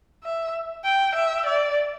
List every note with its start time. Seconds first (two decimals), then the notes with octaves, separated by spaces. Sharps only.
0.24 E5
0.84 G5
1.15 E5
1.46 D5